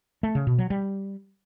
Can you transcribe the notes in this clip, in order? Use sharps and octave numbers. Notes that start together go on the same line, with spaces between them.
A3
C#3
B2
F#3
G3